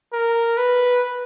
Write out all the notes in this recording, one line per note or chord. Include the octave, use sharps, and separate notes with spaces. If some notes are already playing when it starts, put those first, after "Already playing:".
A#4
B4